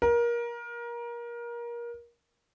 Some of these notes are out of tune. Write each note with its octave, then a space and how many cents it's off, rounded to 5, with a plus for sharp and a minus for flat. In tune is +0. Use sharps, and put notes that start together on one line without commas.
A#4 +25